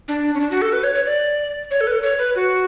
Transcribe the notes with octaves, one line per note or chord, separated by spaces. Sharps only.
D4
C#4
D4
F#4
A4
B4
C#5
C#5
D5
C#5
A4
B4
A4
C#5
B4
F#4